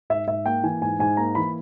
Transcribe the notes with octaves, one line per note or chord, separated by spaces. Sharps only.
G#2 E5
G#2 E5
A#3 G5
E3 G#5
G#2 G#5
G#2 G#5
A#3 A#5
E3 B5